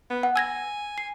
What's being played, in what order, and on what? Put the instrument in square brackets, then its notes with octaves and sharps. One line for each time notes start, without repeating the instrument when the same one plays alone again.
[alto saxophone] B3
[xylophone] F#5
[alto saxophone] G#5 [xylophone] E6 G#6 A#6
[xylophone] C7